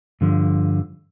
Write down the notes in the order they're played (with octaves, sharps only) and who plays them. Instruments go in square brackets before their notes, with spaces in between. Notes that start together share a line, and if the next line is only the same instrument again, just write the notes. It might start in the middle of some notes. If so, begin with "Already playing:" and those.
[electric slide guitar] G2 D3 F3